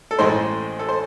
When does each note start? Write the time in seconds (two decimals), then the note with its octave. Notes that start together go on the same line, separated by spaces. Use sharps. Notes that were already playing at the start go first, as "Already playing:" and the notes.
0.11 A4
0.19 A1 A2 G#3 C5
0.79 A4
0.89 C5